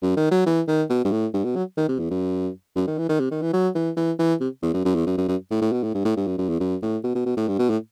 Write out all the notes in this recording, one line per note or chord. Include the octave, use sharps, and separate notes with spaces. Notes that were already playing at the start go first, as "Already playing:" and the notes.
F#2
D#3
F#3
E3
D#3
B2
G2
A2
G2
B2
F#3
D#3
C3
E2
F#2
F#2
D#3
E3
D#3
C3
D#3
E3
F#3
E3
E3
E3
C3
E2
F#2
F#2
E2
F#2
F#2
F#2
A2
A2
B2
A2
G2
A2
G2
F#2
F#2
E2
F#2
A2
B2
B2
B2
A2
G2
B2
A2